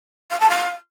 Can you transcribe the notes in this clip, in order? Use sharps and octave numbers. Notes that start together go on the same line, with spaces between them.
F5
A5
F5